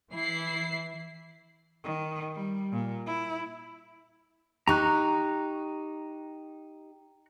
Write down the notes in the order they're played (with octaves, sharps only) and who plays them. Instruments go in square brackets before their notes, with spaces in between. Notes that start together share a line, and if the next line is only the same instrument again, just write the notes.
[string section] E3 E4 C7
[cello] D#3
G3
A#2
E4
[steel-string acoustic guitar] D#4 G4 [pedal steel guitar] A#5 C#6 F#6